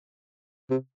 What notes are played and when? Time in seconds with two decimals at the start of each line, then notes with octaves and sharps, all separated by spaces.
0.70 C3